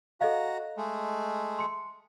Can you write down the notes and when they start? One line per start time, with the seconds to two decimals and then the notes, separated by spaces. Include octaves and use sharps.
0.21 F#4 A4 D#5 F5 A#5
0.77 G#3 A3
1.59 C6 C#7